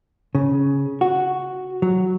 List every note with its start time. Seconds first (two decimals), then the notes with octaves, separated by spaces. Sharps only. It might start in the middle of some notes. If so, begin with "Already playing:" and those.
0.35 C#3
1.01 F#4
1.82 F#3